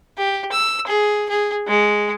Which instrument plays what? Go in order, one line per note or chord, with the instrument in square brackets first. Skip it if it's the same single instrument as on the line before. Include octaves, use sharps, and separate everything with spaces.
[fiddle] G4
E6
G#4
G#4
G#3